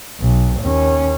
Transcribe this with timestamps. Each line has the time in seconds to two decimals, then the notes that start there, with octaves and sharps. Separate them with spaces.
0.20 B1
0.60 D#2 C#4